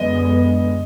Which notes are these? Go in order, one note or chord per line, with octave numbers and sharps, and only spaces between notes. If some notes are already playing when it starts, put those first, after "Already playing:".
Already playing: F#2 D3 G#3 B3 D#5